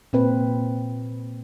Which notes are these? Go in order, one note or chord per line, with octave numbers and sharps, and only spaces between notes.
A#2 C4 B4